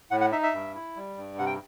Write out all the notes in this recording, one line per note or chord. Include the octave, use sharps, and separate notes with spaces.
A2 F#5
F#5
D#4 E5
E5
G2
E4
G3
G2
C3 F#5
G5